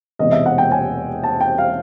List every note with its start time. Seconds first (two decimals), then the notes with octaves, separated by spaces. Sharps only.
0.19 E1 E2 C3 D#5
0.32 E5
0.46 F#5
0.58 G5
0.72 G#5
1.24 A5
1.41 G5
1.58 F5